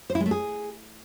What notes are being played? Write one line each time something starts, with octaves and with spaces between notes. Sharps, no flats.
C5
E4
G#3
A3
G#4